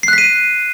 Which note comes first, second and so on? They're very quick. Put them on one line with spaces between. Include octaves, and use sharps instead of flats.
C7 F#6 B6 D#7